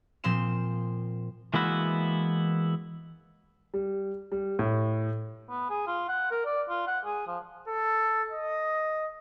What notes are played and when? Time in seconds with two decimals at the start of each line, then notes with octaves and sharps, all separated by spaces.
0.24 A#2 F3 C4 C6 E7
1.54 E3 G#3 A#3 B3 E4 F#4
3.74 G3
4.32 G3
4.59 A2
5.49 B3
5.70 G#4
5.87 F4
6.09 F#5
6.31 A#4
6.45 D5
6.69 F4
6.87 F#5
7.05 G#4
7.27 F3
7.68 A4
8.30 D#5